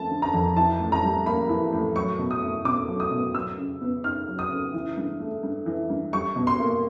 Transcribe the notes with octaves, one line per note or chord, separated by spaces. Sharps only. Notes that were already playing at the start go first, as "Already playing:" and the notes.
Already playing: F3 A3 A5
D3
A#5
F2
E3 A5
A2
A#5
G3
A#3 B5
E3
A2
F#3 C#6
B2
D#6
A3
B2 D6
F#3
D#6
B2
F#3 E6
C#3
B3
D#4 F6
F#3
D#6
C#3
E3
G2
A3
G2
E3
G2
G3 C#6
B2
C6
A#3